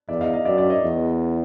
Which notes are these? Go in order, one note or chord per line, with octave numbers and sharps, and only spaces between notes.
E2 D5 E5
D#5 F5
D#5 F5
F#2 D5 E5
D5 E5
C#5 D#5
E2